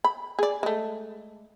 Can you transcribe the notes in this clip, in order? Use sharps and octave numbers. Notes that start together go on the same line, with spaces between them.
B5
G#4 D5
G#3 A3